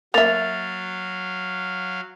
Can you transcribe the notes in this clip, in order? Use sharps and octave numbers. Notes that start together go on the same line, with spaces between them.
F#3 A#3 E5 F5 A6 F7